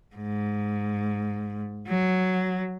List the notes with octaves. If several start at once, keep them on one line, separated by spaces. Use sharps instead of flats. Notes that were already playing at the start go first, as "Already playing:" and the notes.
G#2
F#3